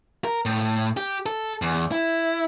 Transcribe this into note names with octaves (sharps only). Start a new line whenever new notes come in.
A#4
A2
G4
A4
E2
E4